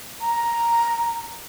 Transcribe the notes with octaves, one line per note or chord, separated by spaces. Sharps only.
A#5